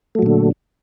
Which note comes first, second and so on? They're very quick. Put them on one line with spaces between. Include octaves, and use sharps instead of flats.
A3 F#3 A#2 D3